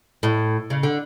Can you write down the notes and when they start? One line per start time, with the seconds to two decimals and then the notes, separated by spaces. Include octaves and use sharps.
0.23 A2
0.70 C#3
0.83 D3